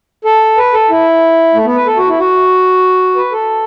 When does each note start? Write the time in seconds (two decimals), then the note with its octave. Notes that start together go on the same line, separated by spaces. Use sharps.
0.25 A4
0.57 B4
0.73 A4
0.90 E4
1.54 A3
1.65 B3
1.76 B4
1.87 A4
1.97 F#4
2.08 E4
2.19 F#4
3.16 B4
3.32 A4